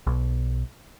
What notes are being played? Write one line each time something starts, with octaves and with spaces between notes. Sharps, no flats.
B1